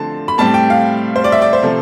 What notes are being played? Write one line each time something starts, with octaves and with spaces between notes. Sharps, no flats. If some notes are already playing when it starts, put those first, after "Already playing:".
Already playing: D3 F3 A3 C4 A5
B5
A2 G3 C4 A5
G5
F5
C5
D5
E5
D5
C5
C3 F3 A3